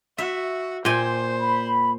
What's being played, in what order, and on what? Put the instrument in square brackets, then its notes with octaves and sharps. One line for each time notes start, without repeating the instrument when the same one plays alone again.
[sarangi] F#4 [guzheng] E5
[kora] A#2 [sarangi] C5 [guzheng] G5 G#5
[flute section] B5